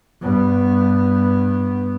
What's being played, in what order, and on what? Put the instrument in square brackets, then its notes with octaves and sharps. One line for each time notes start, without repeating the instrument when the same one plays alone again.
[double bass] G2 B3